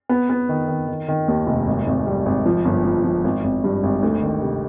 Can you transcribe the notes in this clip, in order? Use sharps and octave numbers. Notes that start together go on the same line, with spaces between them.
B3
B3
D#3
D#3
D#3
D#3
D#2
F1
G#1
G#1
G3
G#1
F3
G1
F3
F3
G#1
G#1
G2
G#1
D2
D#3
C3